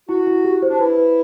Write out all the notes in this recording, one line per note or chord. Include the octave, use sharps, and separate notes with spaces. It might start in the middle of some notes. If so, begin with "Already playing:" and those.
E4 F#4
E4
G4
C5
D4
E4 B4
B4